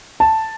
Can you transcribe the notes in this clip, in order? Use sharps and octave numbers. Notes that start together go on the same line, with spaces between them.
A5